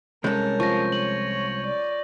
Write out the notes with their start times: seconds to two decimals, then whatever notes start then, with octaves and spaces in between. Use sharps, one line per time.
0.24 C2 G#3 C#4 A4 A#4 G6
0.60 F3 C#6 A#6
0.92 C#5 F#7
1.65 D5